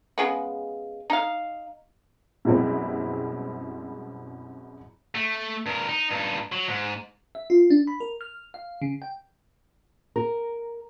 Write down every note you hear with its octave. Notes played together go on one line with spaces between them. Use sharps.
C#3 G#3 B3
D#4 F5
F#2 B2 G3 G#3 C4 E4
A3
G2 A#4
D#4
G2 D#4
F#3
G#2
E5
F4
D4
B5
A#4
F6
F5
C#3
G5
A#4